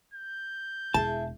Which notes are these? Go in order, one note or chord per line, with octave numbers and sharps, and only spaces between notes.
G6
E1 E4 G#4 A5